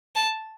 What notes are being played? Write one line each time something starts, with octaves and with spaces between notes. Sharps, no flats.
A5